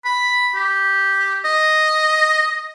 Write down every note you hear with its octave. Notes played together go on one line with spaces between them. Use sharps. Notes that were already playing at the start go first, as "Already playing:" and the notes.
B5
G4
D#5